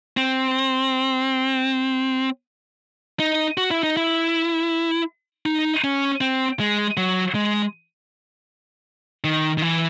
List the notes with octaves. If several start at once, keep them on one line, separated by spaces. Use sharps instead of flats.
C4
D#4
F#4
E4
D#4
E4
D#4
C#4
C4
G#3
F#3
G#3
D#3
D#3
E3